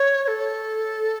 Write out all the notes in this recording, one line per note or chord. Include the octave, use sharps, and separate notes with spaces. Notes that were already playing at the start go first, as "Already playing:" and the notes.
Already playing: C#5
C#5
A4